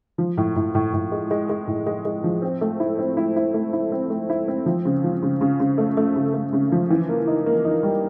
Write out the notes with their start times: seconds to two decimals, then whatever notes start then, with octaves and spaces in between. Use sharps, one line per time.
0.18 F3
0.37 A2
0.56 A2
0.75 A2
0.94 A2
1.12 G#3
1.31 G#3
1.49 G#3
1.68 A2
1.86 G#3
2.05 G#3
2.24 F3
2.42 C4
2.61 A3
2.80 E4
2.99 C4
3.17 E4
3.36 E4
3.54 A3
3.73 E4
3.92 C4
4.10 A3
4.30 E4
4.48 C4
4.66 F3
4.85 C#3
5.04 F3
5.23 C#3
5.41 C#3
5.60 C#3
5.78 A3
5.97 A3
6.16 C#3
6.34 A3
6.53 C#3
6.72 F3
6.90 E3
7.09 A#3
7.27 D#4
7.46 A#3
7.65 D#4
7.83 G3